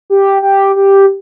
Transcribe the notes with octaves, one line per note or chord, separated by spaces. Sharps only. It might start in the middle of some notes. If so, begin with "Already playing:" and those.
G4
G4
G4